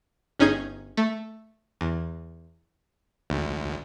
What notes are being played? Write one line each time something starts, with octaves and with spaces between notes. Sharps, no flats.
G1 C#4 D#4 G#4 G6 G#6
A3
E2
D2